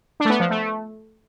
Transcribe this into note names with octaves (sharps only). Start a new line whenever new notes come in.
D4
A3
B3
F3
A3